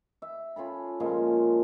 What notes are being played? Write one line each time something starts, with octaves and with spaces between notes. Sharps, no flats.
E5
C#4 F4 A4 B5
A#2 C#3 F3 G#3